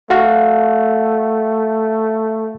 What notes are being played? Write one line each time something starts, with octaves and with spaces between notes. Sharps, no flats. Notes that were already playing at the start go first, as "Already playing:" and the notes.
A3 F#4 F5 F#5